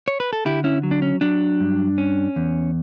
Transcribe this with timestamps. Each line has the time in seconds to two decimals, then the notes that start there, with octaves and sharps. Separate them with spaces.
0.08 C#5
0.20 B4
0.33 A4
0.45 D3 E4 G4
0.64 C#4 E4
0.83 F#3
0.91 D4
1.02 C#4
1.21 F#3 D4
1.60 G2
1.98 C#4
2.36 E2